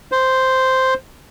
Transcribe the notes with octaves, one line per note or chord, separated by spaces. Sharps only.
C5